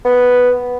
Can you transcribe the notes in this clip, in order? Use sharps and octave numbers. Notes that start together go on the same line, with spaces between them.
B3